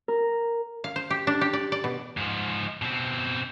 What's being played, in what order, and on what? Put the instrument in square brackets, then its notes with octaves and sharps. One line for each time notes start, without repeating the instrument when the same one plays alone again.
[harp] A#4
[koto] F5
C5
G4
D4
G4
D5
D5
B2
[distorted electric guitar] G#2 F3
B2 C4